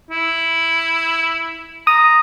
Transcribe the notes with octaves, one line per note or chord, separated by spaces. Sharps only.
E4
A#5 D#6